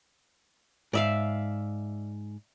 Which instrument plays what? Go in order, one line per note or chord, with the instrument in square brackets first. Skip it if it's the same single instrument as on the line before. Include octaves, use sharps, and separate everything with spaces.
[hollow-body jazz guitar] G#2 [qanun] D5 E5 F5